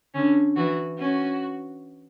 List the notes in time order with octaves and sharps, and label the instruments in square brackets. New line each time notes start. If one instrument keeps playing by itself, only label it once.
[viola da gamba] D3 [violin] C#4
[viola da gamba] E3 [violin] F#4
[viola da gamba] C#4 [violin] F#4